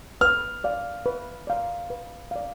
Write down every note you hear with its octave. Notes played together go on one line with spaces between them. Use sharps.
B4 F6
D5 F5
B4
D5 F5
B4
D5 F5